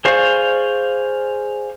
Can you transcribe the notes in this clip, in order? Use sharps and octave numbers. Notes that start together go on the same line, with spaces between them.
G#4 C5 D5 F5 C#6